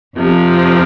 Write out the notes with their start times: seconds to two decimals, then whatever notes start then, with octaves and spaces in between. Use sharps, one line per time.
0.17 F2 C3 F3